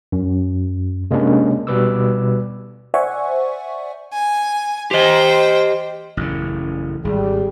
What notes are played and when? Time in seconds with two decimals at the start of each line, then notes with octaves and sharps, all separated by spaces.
0.12 F#2
1.11 C3 G#3 A#3 C#4 D4
1.67 B2 G3 B4 D6 E6
2.94 C5 D5 E5 F#5 G#5 C#6
4.13 G#5
4.91 G4 C5 D#5 G5
6.17 A1 F#2 C#3
7.05 G#1 G3 G#4